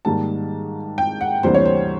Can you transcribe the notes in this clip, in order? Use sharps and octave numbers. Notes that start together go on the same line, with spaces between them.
G#2 D#3 G3 A#3 A5
G5
F#5
D2 C3 E3 G3 A#3 C5
C#5
C5